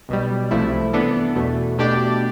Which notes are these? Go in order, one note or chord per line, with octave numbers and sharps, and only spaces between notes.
B1 B2 G3
C2 C3 F3 A3 E4
E3 B3 D4 A4
E2 B2 A3
B2 A3 D4 G4 D5